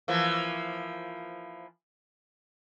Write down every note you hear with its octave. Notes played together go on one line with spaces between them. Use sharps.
E3 F3 A#3